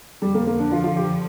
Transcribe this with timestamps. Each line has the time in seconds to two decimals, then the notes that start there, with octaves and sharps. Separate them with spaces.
0.22 F2 D3 F3 G3
0.34 A#3
0.47 A#3
0.59 D4
0.72 F4
0.84 F4
0.96 G4